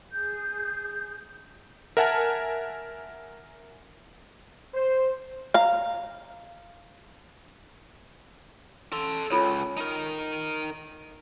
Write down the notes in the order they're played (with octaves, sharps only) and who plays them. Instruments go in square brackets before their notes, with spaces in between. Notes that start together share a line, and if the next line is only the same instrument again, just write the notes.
[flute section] G#4 G6
[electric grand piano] A#4 E5 F#5 G#5 A5
[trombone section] C5
[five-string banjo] F5 A#5
[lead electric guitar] A4 C6
[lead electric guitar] C#2 [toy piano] F4 A4 C#5
[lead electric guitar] D#4 A#4